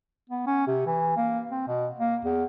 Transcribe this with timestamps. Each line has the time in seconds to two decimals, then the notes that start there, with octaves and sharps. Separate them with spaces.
0.29 B3
0.47 C#4
0.67 C3
0.86 E3
1.17 A#3
1.51 C4
1.68 B2
2.00 A#3
2.24 E2